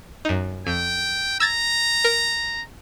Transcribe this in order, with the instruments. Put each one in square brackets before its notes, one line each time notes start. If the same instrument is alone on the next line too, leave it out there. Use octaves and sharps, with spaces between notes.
[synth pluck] F#2 D#4
[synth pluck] F2 [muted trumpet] G5
[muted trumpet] A#5 [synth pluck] E6 G#6 A6
[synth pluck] A#4